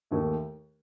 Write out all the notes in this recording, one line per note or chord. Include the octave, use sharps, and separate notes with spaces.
D#2 D#3 A3